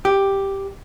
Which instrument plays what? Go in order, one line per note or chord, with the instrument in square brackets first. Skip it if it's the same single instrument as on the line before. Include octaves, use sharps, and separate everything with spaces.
[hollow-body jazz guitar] G4